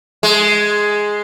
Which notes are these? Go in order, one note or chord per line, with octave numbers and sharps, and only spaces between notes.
G#3